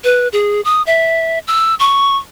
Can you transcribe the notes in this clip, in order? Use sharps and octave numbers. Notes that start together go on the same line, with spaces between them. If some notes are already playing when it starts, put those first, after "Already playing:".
B4
G#4
D#6
E5
E6
C#6